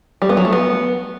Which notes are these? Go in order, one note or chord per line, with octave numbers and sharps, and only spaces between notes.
G3
B3
F#3
A3
B3